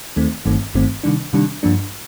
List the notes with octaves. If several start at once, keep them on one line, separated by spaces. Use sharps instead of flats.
D#2 D#3 A3 C4
G1 G2 D#3 A3 C4
G1 G2 D#3 A3 C4
C3 D#3 G3 D4
C3 D#3 G3 D4
G2 F3 A#3 D4